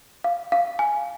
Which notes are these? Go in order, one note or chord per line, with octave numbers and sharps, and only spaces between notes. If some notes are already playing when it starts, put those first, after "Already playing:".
F5
F5
G#5